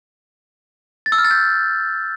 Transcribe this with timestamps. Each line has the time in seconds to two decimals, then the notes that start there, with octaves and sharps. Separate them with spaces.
1.06 A6
1.12 E6
1.18 F6
1.24 A6
1.31 G6